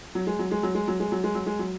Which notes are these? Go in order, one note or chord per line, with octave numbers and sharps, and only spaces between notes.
F#3
G#3
F#3
G#3
F#3
G#3
F#3
G#3
F#3
G#3
F#3
G#3
F#3